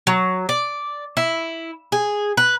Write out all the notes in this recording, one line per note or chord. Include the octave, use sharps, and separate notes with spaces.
F#3
D5
E4
G#4
B4